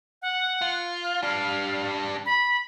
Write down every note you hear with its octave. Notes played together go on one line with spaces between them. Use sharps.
F#5
F4
F6
G3 D4 F5
B5